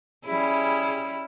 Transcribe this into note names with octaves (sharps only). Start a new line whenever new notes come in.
G3 C#4 E4 G#4